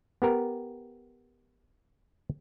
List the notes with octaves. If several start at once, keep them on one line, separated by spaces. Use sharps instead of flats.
B3 G4 A#4